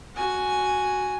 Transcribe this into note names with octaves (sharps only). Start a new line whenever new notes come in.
F#4 G#5